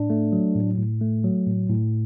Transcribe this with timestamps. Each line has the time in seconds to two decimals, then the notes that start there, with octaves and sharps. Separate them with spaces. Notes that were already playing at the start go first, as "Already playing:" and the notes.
Already playing: A2 D4
0.10 A3
0.32 F#3
0.55 A2
0.78 A2
1.01 A3
1.24 F#3
1.47 A2
1.70 A2